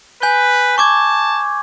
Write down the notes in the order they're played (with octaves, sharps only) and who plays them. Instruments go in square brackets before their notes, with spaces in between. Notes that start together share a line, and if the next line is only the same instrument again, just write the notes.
[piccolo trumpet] B4 [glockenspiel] G#5 G6 G7
[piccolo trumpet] A5 [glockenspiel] C#6 D6 G#6